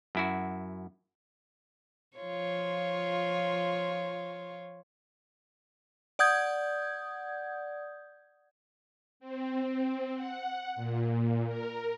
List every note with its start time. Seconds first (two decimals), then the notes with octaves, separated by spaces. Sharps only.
0.15 F#2 E4 F#4
2.17 F3 F4 C#5
6.19 D5 F#5 D#6 G6 G#6
9.20 C4
10.14 F#5
10.76 A#2
11.45 A#4